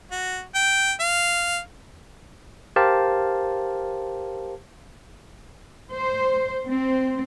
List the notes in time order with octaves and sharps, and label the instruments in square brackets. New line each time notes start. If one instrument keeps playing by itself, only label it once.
[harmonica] F#4
G5
F5
[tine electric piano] G4 A#4 C5 F5 A5
[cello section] C5
C4